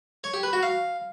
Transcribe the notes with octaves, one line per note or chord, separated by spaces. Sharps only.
C#5
G4
B4
F#4
F5